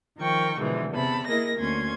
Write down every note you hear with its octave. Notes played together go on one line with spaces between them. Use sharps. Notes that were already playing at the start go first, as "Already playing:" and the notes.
D#3 F3 A#4 G5 C#6
G#2 B2 D3 E3 F3
E2 C3 A5 B5
A#3 E4 G#4 A#4 D#5 A#6
D2 A#3 C#4 C6 G#6